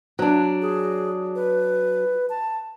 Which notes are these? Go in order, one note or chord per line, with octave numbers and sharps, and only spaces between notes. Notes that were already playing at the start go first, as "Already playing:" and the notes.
F#3 D4
G#4
B4
A5